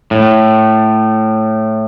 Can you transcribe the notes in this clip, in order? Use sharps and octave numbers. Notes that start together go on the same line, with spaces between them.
A2